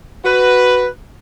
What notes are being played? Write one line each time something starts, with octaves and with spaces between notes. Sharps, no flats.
F#4 B4